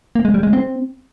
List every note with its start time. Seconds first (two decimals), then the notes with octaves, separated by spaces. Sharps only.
0.15 A#3
0.25 G#3
0.34 G3
0.43 G#3
0.53 C4